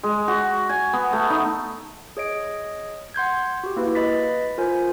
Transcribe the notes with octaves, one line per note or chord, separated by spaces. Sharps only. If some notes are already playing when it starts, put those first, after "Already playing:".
G#3
F#4
G#5
B3
A3
D#4
G#4 C#5 D#5 D7
F#5 C6 G6 G#6
F#4 G4
A#3 E4 B4
B4 D#5 B5 A6 B6
F4 A#4 C5 G#5